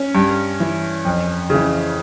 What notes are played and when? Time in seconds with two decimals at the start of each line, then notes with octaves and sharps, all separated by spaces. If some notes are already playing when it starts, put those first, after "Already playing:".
Already playing: C#4
0.15 G2
0.60 E3
1.05 F2
1.50 C#3 E3